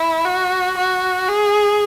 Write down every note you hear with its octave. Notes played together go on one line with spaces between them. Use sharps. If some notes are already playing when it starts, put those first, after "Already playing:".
Already playing: E4
F#4
F#4
G#4